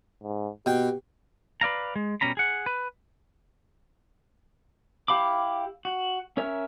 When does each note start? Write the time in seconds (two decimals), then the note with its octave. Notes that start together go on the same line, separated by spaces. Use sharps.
0.23 G#2
0.66 B2 G4 G5
1.61 B4 D5 F5 A#5
1.96 G#3
2.21 B2 G3 C#4 A#5 B5
2.37 G#4 F#5
2.66 B4
5.08 E4 G4 F5 B5 D6
5.85 F#4
6.37 C#4 A#4 C#5 E5